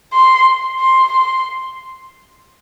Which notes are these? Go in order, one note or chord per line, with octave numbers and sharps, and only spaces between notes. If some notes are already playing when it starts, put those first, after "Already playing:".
C6
C6
C6